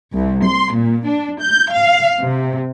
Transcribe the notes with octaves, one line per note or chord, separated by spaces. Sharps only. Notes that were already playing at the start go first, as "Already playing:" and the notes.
C2
C6
A#2
D4
G6
F5
C3